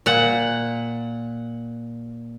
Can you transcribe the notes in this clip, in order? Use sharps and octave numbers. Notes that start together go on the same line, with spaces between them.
A#2 F#5